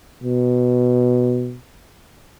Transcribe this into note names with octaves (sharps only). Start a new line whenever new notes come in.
B2